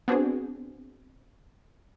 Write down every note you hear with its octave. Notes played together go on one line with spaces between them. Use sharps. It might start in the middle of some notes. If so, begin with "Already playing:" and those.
B3 C4 D4 F#4 G#4